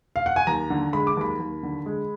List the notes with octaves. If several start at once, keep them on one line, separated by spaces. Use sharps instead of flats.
F5
F#5
G#5
D#2 A#5
D3
G#3 B5
D6
D#2 B5
D#2
D3
G#3